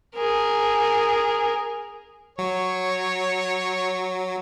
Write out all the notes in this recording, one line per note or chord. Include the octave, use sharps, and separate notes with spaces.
G#4 A#4
F#3 C#5